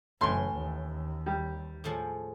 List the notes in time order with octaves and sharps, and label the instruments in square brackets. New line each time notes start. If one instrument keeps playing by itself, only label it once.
[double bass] F#1 [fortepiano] A2 C6 [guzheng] E3 C#4
[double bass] D#2
[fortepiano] G3
[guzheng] A2 F3 G#3